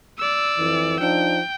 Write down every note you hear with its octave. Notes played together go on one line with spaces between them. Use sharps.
D5 E6
F2 E3
F3 D4 D#4 G5